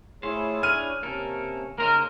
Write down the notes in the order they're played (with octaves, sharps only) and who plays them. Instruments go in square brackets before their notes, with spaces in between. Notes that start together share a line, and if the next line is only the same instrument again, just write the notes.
[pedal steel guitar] A3 F4 C5 [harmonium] E4 G#4 C#5
[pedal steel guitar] D4 G#5 [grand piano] F6 D#7
[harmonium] C3 C#4 [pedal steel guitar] A#3 A4 A#4
[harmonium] C#3 C#4 D#4 [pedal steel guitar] A#3 C5 D#5 [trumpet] A#4